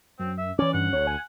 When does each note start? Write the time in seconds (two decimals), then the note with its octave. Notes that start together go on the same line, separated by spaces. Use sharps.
0.19 F#2 C4
0.38 E5
0.59 E3 C#4 C#5 D5
0.74 G2 F#5
0.93 D2 C#5
1.07 G#5